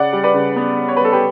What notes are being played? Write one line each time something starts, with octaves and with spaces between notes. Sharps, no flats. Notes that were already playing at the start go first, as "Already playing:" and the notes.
Already playing: C#3 D5 F#5
G3
B4 D5
C#3
B3
C#3
C#5
G3 B4
A4
G4 B4